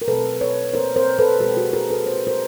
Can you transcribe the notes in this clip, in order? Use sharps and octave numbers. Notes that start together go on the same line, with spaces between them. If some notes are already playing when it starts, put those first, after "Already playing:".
A#4
B2 F#3 A3 C4 A4 B4
B4 C#5
A#4 C5
A#4 C5
A4 B4
B2 G#3 C4 G4 A4
F#4 G#4
G#4 A#4
A4 B4
C5
B4
A#4 C5